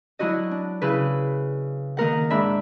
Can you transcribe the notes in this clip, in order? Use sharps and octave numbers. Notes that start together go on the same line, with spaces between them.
F#3 D4 E4 F#4 D#5
D4
C#3 E4 B4
D#3 A#3 A#4 F#5
G#2 D4 E5 B5